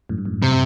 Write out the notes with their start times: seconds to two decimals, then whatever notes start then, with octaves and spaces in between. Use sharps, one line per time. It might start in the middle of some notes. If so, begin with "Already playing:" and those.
0.09 F#2 A2
0.18 G2
0.25 F#2 A2
0.34 G2
0.42 C3